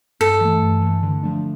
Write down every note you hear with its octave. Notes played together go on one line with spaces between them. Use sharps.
G2 A4
E3 A3
G2
E3 A3
D3
F3 A3 D4